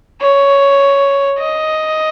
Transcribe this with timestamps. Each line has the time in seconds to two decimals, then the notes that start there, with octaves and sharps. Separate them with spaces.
0.21 C#5
1.39 D#5